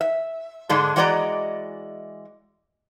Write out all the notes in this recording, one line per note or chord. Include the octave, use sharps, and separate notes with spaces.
E5
G#2 D3 G#3 D4
E3 G#3 F#4 D5 D#5 A#5